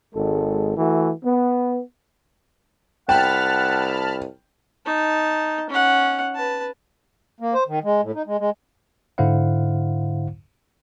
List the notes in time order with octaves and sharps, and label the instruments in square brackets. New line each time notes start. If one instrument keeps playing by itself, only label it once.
[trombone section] G#1 G#3 A4
E3 A3 F#4
B3
[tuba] C2 [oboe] F#5 [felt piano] G5 [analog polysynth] A5 B5 F6
[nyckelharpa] D#4 A5
C#4 F#5
B4 A5
[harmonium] A#3
C5
D#3
G#3
A2
D#4
G#3
G#3
[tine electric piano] G#2 D3 E4 C5 F5 F#5